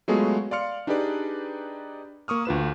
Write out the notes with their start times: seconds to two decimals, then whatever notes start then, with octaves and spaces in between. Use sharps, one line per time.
0.08 F#3 G#3 A3 B3 F4 G#4
0.51 D5 F5 C6 F6 C#7
0.87 D4 D#4 G4 G#4 B4 D5
2.28 A#3 C#6 D#6 F6
2.45 D2 F4 B4 E7